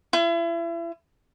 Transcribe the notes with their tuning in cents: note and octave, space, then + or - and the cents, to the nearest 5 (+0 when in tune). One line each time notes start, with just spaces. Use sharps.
E4 +35